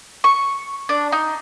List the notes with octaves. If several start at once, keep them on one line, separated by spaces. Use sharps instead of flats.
C#6
D4
D#4